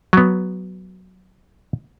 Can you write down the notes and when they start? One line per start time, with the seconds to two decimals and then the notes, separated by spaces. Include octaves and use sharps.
0.13 F#3 B3